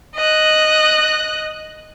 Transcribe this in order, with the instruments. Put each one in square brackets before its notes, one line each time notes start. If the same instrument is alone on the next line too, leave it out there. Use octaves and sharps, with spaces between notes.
[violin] D#5 F#6